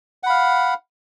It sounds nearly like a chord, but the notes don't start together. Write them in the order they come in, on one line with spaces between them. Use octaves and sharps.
F#5 B5 F5